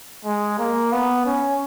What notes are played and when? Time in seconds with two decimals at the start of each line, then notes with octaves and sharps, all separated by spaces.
0.25 G#3
0.59 A#3
0.92 B3
1.26 C#4